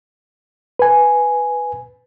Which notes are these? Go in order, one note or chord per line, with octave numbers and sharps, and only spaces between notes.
B4 G#5